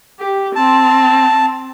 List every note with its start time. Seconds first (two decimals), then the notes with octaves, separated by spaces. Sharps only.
0.20 G4
0.56 C4 A5